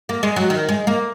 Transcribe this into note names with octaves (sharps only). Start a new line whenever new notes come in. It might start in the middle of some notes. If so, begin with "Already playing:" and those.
A#3
G#3
F#3
D#3
G#3
A#3